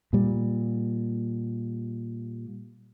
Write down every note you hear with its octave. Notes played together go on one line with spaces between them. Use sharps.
A#2 G3